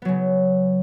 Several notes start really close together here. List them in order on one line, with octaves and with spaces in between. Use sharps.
B3 F#3 C#3